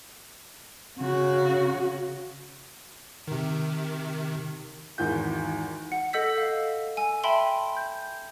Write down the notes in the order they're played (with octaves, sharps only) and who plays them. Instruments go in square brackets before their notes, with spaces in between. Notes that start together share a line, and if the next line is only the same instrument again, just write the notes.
[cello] C#3 F#4
[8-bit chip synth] C3 D#3
[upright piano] G#1 E2 D#3 G6
[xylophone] F#5
A4 D#5 F#5 E6 G6 B6
F5
G#5 E6
E5 G5 A5 B5 C6
G6